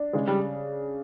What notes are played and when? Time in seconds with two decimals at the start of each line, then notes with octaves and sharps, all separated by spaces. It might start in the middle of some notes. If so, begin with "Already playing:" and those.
Already playing: D4
0.13 C#3 G#3
0.27 G3